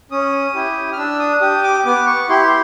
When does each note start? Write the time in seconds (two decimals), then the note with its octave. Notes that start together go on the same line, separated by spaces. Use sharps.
0.12 C#4 D#6
0.54 E4 G4
0.93 F6
0.98 D4 E6
1.19 D#6
1.41 G4 D#6
1.64 D6
1.85 B3 D6
2.06 C#6
2.29 E4 G4 C6